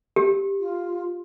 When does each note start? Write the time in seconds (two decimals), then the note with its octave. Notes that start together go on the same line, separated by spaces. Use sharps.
0.16 G4
0.60 F4